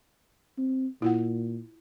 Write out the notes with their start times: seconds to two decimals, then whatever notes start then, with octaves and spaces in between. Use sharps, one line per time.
0.58 C4
1.02 A#2 E4 F4 F#5